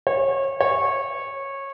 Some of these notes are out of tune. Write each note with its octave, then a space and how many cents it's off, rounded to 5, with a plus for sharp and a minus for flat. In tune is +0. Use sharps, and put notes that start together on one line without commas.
C#5 -25
C#5 -15